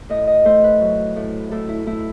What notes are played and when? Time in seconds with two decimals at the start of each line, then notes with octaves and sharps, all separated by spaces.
0.09 A2 D#5
0.27 D#5
0.45 A3 C5
0.64 B4
0.81 F#3
1.16 A2
1.52 A2 A4
1.69 E4
1.86 A3 E4